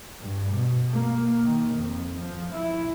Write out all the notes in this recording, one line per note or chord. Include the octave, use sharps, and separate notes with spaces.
G2
B2
A#3
D#3
F2
F3
E4